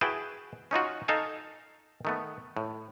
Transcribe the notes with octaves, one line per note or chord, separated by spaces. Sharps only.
E4 F#4 G#4 B4 G5 A5
C#4 D#4 F4 F#4
D#4 A4 F5 G#5
D#3 A3 B3
A2